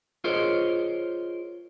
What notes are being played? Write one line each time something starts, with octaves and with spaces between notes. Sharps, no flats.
F4 G#4 A#4 C5 C#5 D#5